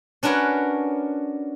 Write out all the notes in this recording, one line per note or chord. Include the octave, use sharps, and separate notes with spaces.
C#4 D4 F#4 A#4 B4 C#5